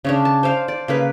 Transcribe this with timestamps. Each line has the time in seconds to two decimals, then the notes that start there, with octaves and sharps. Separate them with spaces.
0.05 C#3 C#4 D4
0.25 A5
0.43 C5 D5 F5
0.68 D5
0.88 C#3 A#3 B4